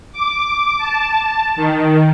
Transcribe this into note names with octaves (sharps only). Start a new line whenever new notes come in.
D6
A5
D#3